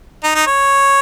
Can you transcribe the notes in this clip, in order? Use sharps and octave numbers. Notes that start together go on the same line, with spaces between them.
D#4
D#4
C#5